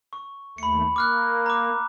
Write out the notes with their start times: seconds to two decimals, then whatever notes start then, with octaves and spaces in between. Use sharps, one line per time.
0.13 C#6
0.58 D#2 A3 B5 C#7
0.96 A#3 D6 F6 F#6
1.46 A#5 D6